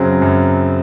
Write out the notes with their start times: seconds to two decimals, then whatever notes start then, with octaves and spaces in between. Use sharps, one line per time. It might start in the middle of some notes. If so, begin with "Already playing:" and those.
Already playing: F#2 C#3 F#3 C4
0.22 F#2